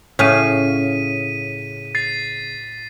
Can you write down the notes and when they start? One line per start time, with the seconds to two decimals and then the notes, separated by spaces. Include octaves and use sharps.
0.19 A2 C#3 C#4 F5 B6 D#7
1.95 A6 C7